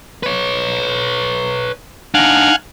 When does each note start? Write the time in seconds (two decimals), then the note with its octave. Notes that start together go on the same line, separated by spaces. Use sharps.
0.23 B4 C#5
2.14 D4 D#4 F5 F#5 G#5